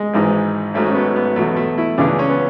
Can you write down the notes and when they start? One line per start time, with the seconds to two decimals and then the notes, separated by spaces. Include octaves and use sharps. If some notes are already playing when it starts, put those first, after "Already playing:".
Already playing: G#3
0.14 G#1 G#2 E3
0.74 G#1 G#2 F#3 A3
0.86 C#4
0.95 B3
1.16 B3
1.36 E2 B2 F#3 A3
1.56 A3
1.78 E4
1.98 C#2 C#3 E3 D4
2.19 C#4
2.30 B3